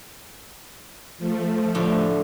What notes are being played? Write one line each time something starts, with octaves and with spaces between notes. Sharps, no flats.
F3 A3
A2 D3